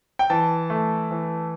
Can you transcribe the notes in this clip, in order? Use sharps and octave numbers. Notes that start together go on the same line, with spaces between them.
G5
E3 A5
A3
E3